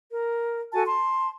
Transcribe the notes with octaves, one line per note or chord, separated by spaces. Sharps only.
A#4
F#4 A4 G#5 A5
A5 C6